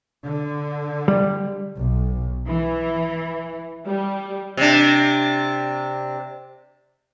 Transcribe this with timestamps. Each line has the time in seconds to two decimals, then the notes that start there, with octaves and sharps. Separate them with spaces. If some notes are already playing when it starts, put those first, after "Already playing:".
0.24 D3
1.08 G3
1.76 B1
2.49 E3
3.87 G3
4.57 C3 D4